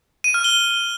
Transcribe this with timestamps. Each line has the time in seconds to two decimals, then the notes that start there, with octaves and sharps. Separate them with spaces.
0.24 D#7
0.34 F6
0.44 G7